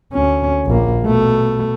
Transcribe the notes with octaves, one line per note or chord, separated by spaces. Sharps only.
D2 C#4
A#1 A#3
B2 A3